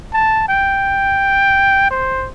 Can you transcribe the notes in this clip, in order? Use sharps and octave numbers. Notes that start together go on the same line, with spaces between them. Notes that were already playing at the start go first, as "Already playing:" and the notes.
A5
G5
C5